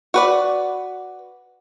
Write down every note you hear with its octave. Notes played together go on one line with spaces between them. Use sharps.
F#4 B4 D5